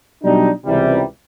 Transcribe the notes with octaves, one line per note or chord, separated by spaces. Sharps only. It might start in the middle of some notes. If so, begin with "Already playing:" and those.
B2 F#3 G3 D4 D#4
C#2 C3 E3 G3